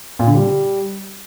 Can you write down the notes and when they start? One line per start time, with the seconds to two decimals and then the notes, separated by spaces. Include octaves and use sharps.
0.19 A#2
0.27 D3
0.35 G3